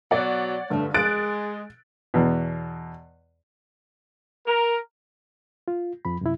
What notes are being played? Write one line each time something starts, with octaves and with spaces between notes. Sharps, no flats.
B2 F#3 C#5 D5 F#5
G2 D3 A3
G#3 F#6 A6 D7
E2 B2
A#4
F4
F2 F3 B5
F#2 C3 E4